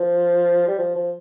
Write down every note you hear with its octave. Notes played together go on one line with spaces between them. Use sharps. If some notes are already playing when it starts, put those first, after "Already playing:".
Already playing: F3
G3
F3
F3